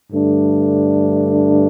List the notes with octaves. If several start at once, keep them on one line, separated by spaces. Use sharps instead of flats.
G2 D3 A3 D4